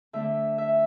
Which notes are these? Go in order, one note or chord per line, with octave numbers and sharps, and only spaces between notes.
D3 A3 D4 E5
E5